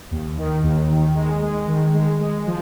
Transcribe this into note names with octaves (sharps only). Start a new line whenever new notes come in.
D#2
D#3
D#2
D#3
G#3
G#3
D#3
G#3
G#3
F3